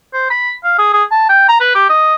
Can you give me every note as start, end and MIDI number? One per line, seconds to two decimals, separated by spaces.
0.13 0.27 72
0.30 0.52 83
0.64 0.76 77
0.78 0.89 68
0.93 1.04 68
1.11 1.24 81
1.29 1.47 79
1.49 1.57 82
1.60 1.74 71
1.75 1.88 67
1.90 2.15 75